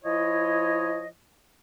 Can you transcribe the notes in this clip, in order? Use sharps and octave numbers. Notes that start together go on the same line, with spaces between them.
F3 E4 C#5 D#5